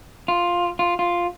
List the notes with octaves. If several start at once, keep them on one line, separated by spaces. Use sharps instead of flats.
F4
F4
F4